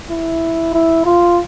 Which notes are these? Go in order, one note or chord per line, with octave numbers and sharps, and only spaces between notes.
E4
E4
F4